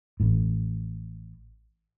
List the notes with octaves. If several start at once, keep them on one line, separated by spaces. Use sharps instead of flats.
A1 A2